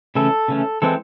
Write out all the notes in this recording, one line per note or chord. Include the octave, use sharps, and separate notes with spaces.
C#3 E3 A3 C#4 A4
C#3 E3 A3 C#4
E3 G#3 C4 A4